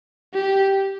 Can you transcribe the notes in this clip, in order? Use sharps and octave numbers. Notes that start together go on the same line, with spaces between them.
G4